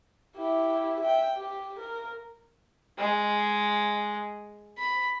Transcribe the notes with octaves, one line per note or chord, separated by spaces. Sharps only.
E4 G4
E5 G5
G4
A#4
G#3
B5